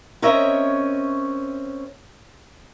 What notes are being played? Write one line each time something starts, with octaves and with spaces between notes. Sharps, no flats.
C4 C#4 A#4 C#5 D#5 E5